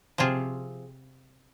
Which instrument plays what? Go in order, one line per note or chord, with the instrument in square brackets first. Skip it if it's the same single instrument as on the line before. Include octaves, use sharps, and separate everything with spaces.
[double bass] C3 [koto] F3 C4 F4 G#4